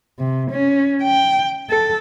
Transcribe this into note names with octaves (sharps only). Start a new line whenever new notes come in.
C3
C#4
G5
A4